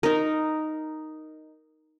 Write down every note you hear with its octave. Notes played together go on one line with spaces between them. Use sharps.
D#4 A#4